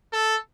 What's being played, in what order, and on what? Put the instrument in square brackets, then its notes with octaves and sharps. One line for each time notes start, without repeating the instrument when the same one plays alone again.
[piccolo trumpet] A4